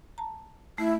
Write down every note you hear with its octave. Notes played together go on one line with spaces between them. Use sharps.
A5 A#5
A3 E4